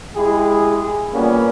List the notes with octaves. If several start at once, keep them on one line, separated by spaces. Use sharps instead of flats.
G#3 E4 G4 G#4
A#2 G3 A#3 B3 C#4